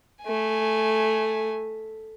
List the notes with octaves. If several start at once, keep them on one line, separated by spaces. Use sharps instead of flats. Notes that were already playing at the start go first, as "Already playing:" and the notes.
A3 G#5